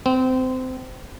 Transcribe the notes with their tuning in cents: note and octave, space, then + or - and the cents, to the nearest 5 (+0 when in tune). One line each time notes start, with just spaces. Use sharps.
C4 -25